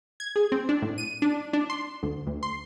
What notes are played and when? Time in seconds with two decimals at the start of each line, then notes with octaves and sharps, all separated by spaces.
0.20 G#6
0.36 G#4
0.52 C4
0.69 D4
0.82 A2
0.98 D#7
1.22 D4
1.53 D4
1.70 C6
2.03 D2
2.27 D2
2.43 C6